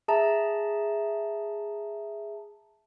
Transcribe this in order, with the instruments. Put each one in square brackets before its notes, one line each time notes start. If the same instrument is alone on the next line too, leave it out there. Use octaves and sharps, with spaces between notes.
[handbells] G#4 E5 A5 A#5